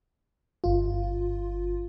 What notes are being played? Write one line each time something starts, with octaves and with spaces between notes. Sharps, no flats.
G1 F4